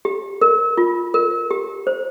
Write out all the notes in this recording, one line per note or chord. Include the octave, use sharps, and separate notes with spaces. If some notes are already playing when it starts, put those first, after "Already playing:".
G4
A#4
F4
A#4
G4
C5